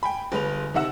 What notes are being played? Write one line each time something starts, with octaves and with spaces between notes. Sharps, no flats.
G5 G#5 B5
G1 G#3 B4 F7
C3 D#3 E5 F#5 E6 E7